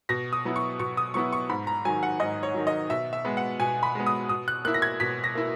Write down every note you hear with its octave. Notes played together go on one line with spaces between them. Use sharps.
B2 A#6
D#6
F#3 B3 E4
C#6
B2 C#6
D#6
F#3 B3 E4 C#6
C#6
G#2 B5
A#5
D#3 F#3 G#5
F#5
G#2 D#5
C#5
D#3 F#3
D#5
B2 E5
E5
G#3 B3
F#5
B2 G#5
B5
G#3 B3
D#6
B2 D#6
F#6
A#3 E4 F#6
A#6
G#6
B2 B6
A#6
A#3 E4